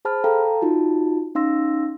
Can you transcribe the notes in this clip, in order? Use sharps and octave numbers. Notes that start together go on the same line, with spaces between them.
G#4 C5 A5 B5 F6
A4 F5 G5 A5 A#5
D#4 F4 F#4 A5
C#4 D#4 F5 C6 E6 A#6